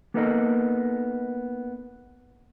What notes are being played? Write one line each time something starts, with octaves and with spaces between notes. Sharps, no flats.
A#3 B3 D#4 A4 A#4 D#5